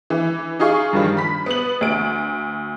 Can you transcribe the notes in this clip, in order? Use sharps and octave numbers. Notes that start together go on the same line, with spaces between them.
E3
D#4 F4 G#4 C#6
G2 D#3 F3 G3
B5 B6
B3 F#7
D2 D7